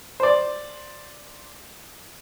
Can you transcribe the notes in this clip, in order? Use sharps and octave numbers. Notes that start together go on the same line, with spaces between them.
C5 D5